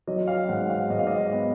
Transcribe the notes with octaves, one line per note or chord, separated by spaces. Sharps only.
F#3 D#5
F5
G#2 F#5
F5
G#2 D#5
F5
D#5
B3